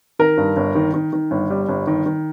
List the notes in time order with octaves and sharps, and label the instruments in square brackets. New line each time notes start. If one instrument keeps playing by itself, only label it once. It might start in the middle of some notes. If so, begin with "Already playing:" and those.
[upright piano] D#3 A#4
G2
G1
D#3
D#3
D#3
G1
G3
G1
D#3
D#3